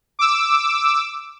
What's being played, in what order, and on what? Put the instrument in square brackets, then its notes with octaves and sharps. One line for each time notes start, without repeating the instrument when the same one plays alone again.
[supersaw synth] D6 E6